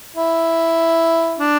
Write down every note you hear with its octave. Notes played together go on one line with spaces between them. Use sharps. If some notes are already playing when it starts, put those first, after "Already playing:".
E4
D4